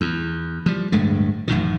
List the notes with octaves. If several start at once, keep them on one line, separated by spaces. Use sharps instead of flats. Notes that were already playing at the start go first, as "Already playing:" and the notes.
E2
F3 G3
D1 G2 G#3 A3
A1 F#2 A2 D#3